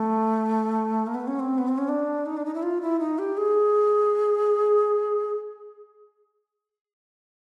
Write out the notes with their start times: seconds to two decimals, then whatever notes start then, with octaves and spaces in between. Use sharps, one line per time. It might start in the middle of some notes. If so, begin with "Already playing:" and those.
Already playing: A3
1.07 A#3
1.15 B3
1.28 C#4
1.40 C4
1.58 B3
1.68 C4
1.78 C#4
1.88 D4
2.26 D#4
2.37 D4
2.45 D#4
2.54 E4
2.63 F4
2.82 E4
2.99 D#4
3.19 G4
3.37 G#4